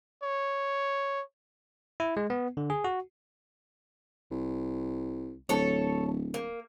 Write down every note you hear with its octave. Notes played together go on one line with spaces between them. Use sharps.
C#5
E4
G#3
B3
D3
G#4
F#4
C2
D1 A4 C#5
A#3